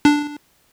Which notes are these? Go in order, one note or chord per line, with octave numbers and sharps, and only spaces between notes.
D4